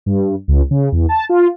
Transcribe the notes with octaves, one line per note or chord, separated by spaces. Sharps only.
G2
C#2
C#3
E2
A5
F4